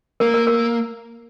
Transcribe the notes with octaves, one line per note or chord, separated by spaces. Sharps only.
A#3 A#4
A#4
A#4